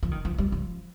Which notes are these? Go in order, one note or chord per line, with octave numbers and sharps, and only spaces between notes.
F3
D#3
F3
G3
F3